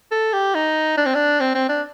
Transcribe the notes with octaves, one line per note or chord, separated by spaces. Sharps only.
A4
G4
D#4
D4
C4
D4
C4
C4
D4